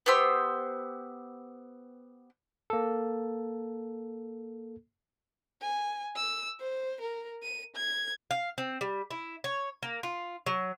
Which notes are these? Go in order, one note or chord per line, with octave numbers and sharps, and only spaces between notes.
B3 G4 C5 E6
A#3 A4
G#5
E6
C5
A#4
D#7
G#6
F5
C4
G3
E4
C#5
A#3
F4
F#3